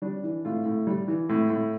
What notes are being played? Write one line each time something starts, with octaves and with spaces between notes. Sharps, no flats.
G3 D4
E3
A2 F4
A2
G3
E3
A2
A2